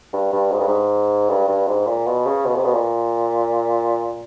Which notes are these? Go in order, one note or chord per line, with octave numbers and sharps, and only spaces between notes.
G2
G2
G#2
G2
G#2
G2
G2
G#2
A#2
B2
C#3
B2
C3
B2
A#2